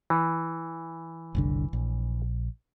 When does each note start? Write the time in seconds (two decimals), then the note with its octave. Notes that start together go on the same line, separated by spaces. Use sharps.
0.10 E3
1.35 F#1 C2 D3
1.73 A#1